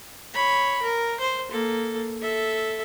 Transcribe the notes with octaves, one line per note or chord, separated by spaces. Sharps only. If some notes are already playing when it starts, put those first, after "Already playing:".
C#5 B5
A#4
C5
A#3 A4
A4 E5